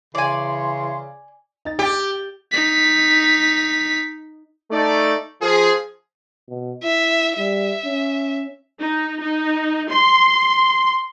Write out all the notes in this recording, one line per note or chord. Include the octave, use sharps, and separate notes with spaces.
C#3 E3 C#5 D5 G#5 C6
D#4 A6
G4 G5 A6
D#4 B6
A3 D#4 D5
F3 G#4
B2
E4 E5
G3 E5
C#4
D#4
D#4
C6